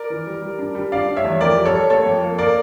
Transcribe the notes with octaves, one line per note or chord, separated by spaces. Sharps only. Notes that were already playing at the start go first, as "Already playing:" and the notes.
Already playing: A#4 D5
E3
G3
G3
D4
G3
D4 D5 F5
G3
C#5 E5
E2
F2 A#4 D5
G3
A4 C#5
G3
A#3 A4 C#5
F2
A#3
A#3 A#4 D5